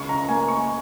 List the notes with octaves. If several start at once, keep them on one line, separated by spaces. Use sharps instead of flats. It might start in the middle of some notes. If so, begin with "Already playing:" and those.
Already playing: C#2 C#3 C#6
A#5
A#3 G#5
C#6